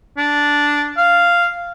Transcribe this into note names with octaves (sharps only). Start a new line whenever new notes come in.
D4
F5